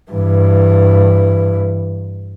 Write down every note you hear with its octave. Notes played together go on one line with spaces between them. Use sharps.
G2 E3